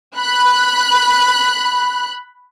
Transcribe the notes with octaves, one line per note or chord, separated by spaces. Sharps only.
B5 F#6